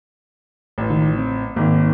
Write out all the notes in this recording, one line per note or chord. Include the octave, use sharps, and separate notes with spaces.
A1
C#2 D#3 F4
C4
G#1 D#3 A#3